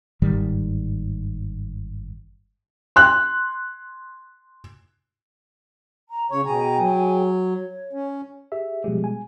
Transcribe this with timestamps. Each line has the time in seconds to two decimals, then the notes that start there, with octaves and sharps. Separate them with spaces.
0.22 G1 G#2 D#3 G3
2.96 C6 F#6
6.09 A#5
6.31 C#3 C#4 C#5 C#6
6.46 B2 G#4 G5 G#5 A#5
6.78 F#3
7.28 C#5
7.93 C#4
8.52 G4 G#4 E5
8.84 B2 F3 G3 G#3 G4
9.04 G#5